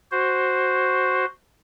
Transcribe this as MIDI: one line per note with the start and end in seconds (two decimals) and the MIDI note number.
0.12 1.25 66
0.12 1.25 72